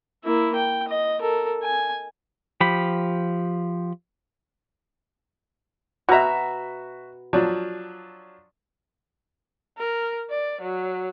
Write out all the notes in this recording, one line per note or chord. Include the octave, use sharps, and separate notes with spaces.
A#3 E4
G5
D#5
A4 A#4
G#5
F3 G4 B5
B2 F#4 E5 A#5
F3 F#3 D4
A#4
D5
F#3